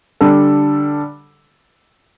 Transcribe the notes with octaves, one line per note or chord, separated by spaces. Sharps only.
D3 G3 D4 A4